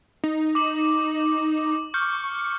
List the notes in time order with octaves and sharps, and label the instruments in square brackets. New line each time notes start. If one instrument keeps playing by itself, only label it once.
[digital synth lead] D#4
[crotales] D6 F#7
[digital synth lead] C#6 [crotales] F6 G6